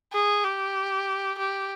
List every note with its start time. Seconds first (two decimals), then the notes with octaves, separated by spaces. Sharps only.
0.13 G#4
0.44 G4
1.38 G4